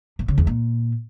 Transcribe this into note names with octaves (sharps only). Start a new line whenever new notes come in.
A#2
C#3
E2
A#2